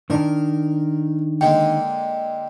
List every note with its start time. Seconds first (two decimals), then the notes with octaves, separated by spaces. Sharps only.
0.10 D#3 D4 A#4
1.41 D3 G#3 A#3 G5